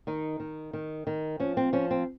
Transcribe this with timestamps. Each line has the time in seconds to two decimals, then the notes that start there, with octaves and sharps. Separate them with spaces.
0.07 D#3 D#4
0.40 D#3
0.73 D#3
1.07 D#3
1.40 F3 C#4
1.57 C4
1.73 F3 C#4
1.91 C4